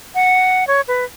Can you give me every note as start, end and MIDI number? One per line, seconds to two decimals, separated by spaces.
0.15 0.67 78
0.67 0.81 73
0.88 1.05 71